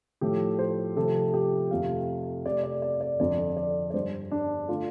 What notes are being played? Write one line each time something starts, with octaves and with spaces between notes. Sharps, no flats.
A2 F3 A3 G4
C5
C3 F3 A3 A4
G4
F2 C3 A3 F5
C3 A3 D5
D5
D5
D5
F2 D3 F3 D5
D5
D5
G2 G3 C5
D4
D3 A3 F4